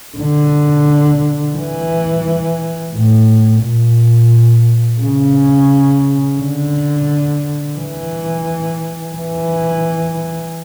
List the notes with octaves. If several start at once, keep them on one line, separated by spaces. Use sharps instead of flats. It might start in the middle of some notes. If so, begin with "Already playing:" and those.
D3
E3
A2
A#2
C#3
D3
E3
E3